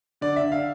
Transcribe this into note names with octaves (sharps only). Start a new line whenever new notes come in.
D3 D5
E5
D3
F5